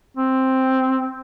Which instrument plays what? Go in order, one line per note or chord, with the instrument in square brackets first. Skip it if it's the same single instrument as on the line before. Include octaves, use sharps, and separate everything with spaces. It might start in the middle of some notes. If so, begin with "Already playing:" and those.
[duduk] C4